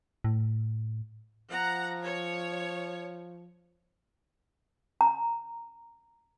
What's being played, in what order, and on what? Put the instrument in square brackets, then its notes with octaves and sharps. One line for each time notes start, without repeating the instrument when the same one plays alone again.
[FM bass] A2
[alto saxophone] F3 [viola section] F#5 A#5
[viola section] C#5
[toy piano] A#5